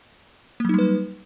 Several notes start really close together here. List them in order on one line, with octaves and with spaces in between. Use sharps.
A#3 F#3 D#4 G3 B4